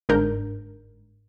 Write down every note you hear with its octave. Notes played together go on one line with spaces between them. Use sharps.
G1 G#2 D4 A#4 G6